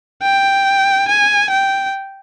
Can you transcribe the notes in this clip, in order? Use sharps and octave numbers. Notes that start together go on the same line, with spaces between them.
G5
G#5
G5